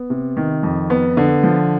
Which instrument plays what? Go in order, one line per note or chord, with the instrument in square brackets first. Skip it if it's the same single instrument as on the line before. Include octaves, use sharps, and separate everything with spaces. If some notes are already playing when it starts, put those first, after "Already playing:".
Already playing: [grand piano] B3
C3
D#3
F2
B3
D3
F3